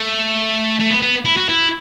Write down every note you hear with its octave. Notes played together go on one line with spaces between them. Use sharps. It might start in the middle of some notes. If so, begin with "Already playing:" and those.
Already playing: A3
A3
B3
B3
E4
F#4
E4